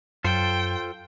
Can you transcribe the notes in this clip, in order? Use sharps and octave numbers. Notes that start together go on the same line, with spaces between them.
F#2 F4 A4 C5 G5